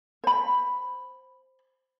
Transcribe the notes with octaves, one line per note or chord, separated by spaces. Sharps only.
C5 B5